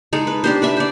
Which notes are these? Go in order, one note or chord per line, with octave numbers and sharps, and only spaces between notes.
G#3 D#4 A4
B4
D4 G4 C5
B4 D5 E5
C5 D5